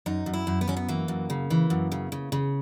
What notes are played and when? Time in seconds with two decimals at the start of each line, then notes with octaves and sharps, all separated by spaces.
0.06 F#2 D#4
0.26 F#2
0.34 E4
0.47 F#2
0.61 B3
0.68 F#2 C#4
0.77 B3
0.88 E3 A#3
1.08 F#2
1.30 C#3
1.50 E3
1.70 F#2
1.92 C#3
2.12 C#3
2.32 C#3